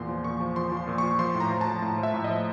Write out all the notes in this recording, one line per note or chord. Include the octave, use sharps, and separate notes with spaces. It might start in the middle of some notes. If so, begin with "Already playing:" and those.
Already playing: E2 A#2 C6
F3
A#2 C#6
F3
F3 C6
F3
C6
A#2
F3 C#6
F3 C6
A2
A#5
F3
A5
F3
A2
F3
E5
A2
D#5
F3